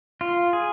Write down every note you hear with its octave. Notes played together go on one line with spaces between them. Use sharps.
F4
G#4